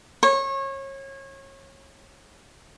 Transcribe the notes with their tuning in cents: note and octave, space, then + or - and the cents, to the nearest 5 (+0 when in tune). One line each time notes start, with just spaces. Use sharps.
C#5 -30